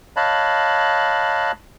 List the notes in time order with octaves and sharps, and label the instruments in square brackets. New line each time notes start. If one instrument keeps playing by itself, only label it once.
[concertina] C#5 D#5 F5 A5 B5 F#6